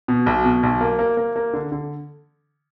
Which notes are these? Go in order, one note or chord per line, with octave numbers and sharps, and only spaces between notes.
B2
B1
B2
B1
A#3
A#3
A#3
A#3
D3
D3